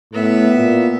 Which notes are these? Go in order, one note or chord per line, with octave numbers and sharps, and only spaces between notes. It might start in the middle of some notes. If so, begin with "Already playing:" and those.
A2 B3 E5
A#2